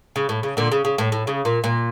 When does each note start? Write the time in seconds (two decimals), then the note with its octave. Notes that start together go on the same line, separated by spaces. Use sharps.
0.16 C#3
0.29 A2
0.43 C#3
0.57 A#2 D3
0.72 C#3
0.85 C#3
0.98 A2
1.12 A2
1.27 C#3
1.45 A#2
1.64 A#2